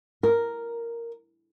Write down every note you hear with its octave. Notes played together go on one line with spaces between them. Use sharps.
A#4